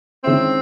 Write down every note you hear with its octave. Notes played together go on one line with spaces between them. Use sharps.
D#3 G#3 C4 C#4 E4